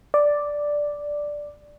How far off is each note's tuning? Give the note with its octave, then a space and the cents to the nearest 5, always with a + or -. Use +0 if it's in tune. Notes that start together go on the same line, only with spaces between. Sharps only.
D5 +0